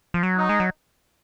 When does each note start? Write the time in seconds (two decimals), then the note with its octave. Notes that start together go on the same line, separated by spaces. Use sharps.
0.14 F3
0.23 F#3
0.37 D#4
0.49 G#3
0.60 F#3